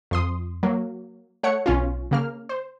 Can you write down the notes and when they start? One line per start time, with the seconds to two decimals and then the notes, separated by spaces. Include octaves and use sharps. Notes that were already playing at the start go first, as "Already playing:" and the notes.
0.11 F2 C6 D#6
0.63 F#3 A#3
1.43 A3 C#5 F#5 C#7
1.66 B1 C#4 F4
2.11 C#3 A#3 F6
2.49 C5